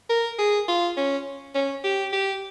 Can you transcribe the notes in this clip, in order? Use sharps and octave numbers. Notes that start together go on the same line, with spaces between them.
A#4
G#4
F4
C#4
C#4
G4
G4